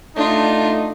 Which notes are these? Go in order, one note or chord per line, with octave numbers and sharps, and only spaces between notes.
A3 D4 D#4 F4